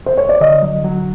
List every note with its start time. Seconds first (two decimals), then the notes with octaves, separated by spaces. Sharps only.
0.06 C5
0.17 C#5
0.29 D5
0.41 D3 D#5
0.62 F#3
0.84 F#3